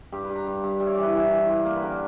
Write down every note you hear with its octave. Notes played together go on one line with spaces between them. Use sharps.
G2 G4
B4
G2
A#5
G2
G2
G3 E5
C#5
D5
E3
B4
E3
E3
G2
A#3
B4
D3 A#4